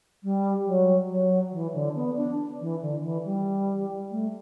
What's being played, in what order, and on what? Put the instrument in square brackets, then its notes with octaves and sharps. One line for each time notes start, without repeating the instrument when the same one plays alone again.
[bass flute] G3
F#3
F#3
E3
D3
B3
D4
E3
D3
E3
G3
A3